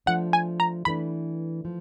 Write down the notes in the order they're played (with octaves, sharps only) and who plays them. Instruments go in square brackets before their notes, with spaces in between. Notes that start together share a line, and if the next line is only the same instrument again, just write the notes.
[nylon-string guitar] F3 A3 D4 [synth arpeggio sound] F#5
[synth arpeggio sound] G#5
A#5
[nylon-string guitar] E3 A3 D4 [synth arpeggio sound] B5
[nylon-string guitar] F3